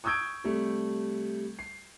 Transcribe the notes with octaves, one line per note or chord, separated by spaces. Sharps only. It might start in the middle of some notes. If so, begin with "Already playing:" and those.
C#6 D#6 E6 G6 G#6 D7
C3 G3 A3
C7